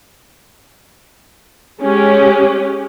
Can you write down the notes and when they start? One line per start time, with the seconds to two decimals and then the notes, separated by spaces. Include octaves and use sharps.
1.80 G#3 C#4 G4